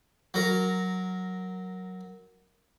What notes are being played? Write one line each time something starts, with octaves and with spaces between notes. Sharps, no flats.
F#3 A#4